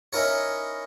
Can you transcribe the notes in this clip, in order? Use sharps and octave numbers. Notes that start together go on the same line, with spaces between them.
C#4 D#4 E4 A#4 C#5